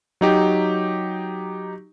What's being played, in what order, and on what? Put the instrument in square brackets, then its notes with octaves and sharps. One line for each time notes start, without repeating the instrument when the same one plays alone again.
[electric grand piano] F#3 D#4 G4